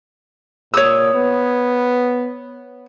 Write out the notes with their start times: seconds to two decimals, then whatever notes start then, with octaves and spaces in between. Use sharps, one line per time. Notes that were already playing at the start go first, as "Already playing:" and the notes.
0.74 A#2 C#5 D#6 E6
1.14 B3